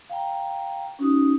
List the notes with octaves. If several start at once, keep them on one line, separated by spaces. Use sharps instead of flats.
F5 G5 A#5
C#4 D#4 F#4 D#6